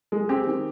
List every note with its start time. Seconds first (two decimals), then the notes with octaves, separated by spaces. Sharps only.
0.12 G#3
0.29 C4 G4
0.47 D#3